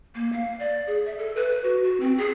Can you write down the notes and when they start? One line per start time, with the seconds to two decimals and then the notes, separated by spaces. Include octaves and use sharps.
0.15 A#3
0.33 F5
0.60 D5
0.87 G#4
1.06 E5
1.18 A4
1.36 B4
1.64 F#4
1.83 F#4
2.00 C4
2.18 G#4